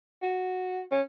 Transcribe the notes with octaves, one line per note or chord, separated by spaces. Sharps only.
F#4
C#4